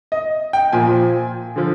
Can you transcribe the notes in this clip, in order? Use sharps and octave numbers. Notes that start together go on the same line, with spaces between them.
D#5
G5
A#2 F3 G#5
D3 F3